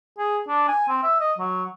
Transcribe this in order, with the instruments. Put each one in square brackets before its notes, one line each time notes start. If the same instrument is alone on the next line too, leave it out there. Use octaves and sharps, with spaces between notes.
[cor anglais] G#4
D4
G#5
C4
E5
D#5
F#3